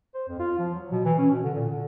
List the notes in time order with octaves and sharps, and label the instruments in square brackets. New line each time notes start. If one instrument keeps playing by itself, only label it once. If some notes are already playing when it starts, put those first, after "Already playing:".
[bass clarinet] C5
F2
F4
F3
F#3
B2
E3
C#4
B2
D3
A#2
D3